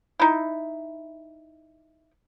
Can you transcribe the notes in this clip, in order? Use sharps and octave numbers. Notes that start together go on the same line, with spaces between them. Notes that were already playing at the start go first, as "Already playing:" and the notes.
D#4 E4